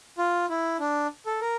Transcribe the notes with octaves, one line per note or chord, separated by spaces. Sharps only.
F4
E4
D4
A4
A#4